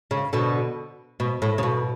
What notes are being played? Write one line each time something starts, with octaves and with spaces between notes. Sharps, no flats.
C#3
B2 D3
B2
A2
C#3
B2